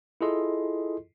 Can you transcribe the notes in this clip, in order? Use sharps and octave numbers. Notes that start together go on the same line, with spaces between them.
E4 F4 G#4 A4 D#5 C6